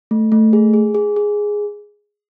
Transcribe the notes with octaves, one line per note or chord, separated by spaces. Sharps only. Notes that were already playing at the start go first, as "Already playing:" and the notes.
A3
A3
G#4
G#4
G#4
G#4